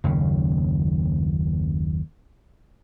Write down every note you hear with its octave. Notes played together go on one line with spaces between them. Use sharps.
F#1 D#2 C#3